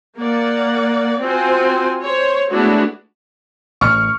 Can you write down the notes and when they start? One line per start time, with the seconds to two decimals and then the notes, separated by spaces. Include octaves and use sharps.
0.18 A#3 D5 F#5
1.20 C4 F4 F#4 C5 G#5
2.02 C5 C#5
2.49 G#3 A3 B3 D4 E4 F#4
3.81 A1 C#6 F6